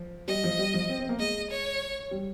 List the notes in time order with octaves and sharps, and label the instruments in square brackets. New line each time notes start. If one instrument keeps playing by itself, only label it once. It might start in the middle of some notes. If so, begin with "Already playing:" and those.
Already playing: [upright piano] F3
[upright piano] G3 [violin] D#5
[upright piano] F3
G3
F3
C4
C4
A#3
[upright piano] G#3 [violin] D#5
[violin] C#5
[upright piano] G3